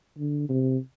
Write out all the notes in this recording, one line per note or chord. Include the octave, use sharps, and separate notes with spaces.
D3
C3